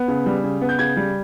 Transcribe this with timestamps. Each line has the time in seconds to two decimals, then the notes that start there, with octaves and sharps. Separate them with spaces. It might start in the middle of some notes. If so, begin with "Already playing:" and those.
Already playing: B3
0.08 C#3
0.26 G3
0.44 C#3
0.62 B3
0.69 G6
0.79 C#3 G#6
0.97 G3